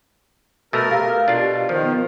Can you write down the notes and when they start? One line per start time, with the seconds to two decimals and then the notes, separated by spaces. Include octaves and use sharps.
0.73 B2 A3 A4 A#4 A#5 E6
0.91 A3 G4 F5
1.28 B2 D4 F4
1.69 D#3 F3 C5
1.84 B3